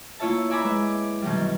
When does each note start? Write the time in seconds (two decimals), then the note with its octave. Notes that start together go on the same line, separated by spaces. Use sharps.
0.19 A#3 E4 F4 C#5 E5 A5
0.50 D5 E5 G#5 A#5 B5 D6
0.64 G#3 B4 E5
0.87 D6
1.22 F#2 B2 D#3 E3 G3